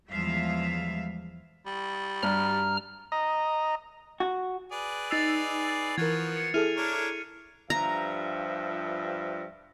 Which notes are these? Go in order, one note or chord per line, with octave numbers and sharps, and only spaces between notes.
E2 F3 G3 G#3 E5 F5
G3
G2 A#5 F6
D#5 A#5
F#4
G#4 B4 D5
D#4 E6 A6 C7 F7
E3 F3 B3 F#4 A#4 G#6
G#6 C#7
E4 G#4 A4 F6 D#7 F7
D4 A#4 C#5
G2 F3 E5 A#5